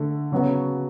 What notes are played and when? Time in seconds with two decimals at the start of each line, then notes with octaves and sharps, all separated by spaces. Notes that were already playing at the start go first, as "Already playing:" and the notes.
Already playing: D3 A3
0.32 C#3 F#3 B3 F#4